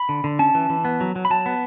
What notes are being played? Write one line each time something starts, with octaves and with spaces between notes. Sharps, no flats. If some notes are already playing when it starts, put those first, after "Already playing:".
Already playing: B5
D3
D3
C#4 A5
E3
E3
B3
F#3
F#3
B5
F#3 A5
B3